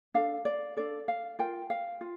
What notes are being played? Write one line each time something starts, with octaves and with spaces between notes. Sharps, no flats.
D4 A4 F5
D5
D4 A4 D5
F5
F4 A#4 G5
F5
F4